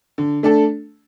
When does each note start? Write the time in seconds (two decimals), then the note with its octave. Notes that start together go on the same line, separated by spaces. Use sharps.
0.18 D3
0.43 A3 D4 A4